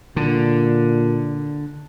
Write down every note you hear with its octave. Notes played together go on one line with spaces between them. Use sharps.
A#2 D3